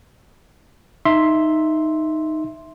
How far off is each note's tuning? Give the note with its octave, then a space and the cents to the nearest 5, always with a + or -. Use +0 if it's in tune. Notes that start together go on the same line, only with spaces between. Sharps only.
D#4 +0 E5 +0 C6 +0